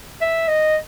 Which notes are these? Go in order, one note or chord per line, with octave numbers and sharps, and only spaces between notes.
E5
D#5